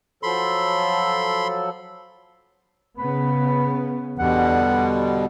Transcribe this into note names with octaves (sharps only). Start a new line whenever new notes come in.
F3 F#3 A4 B5 C6
C#3 B3 B5
E2 B2 D3 G3 F#5